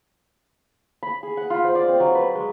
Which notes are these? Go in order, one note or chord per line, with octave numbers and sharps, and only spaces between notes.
B5
G#4
F#5
F4
C5
D5
C4
F#3
B4
G#3